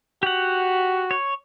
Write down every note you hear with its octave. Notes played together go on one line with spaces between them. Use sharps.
F#4 G4 F#5
C#5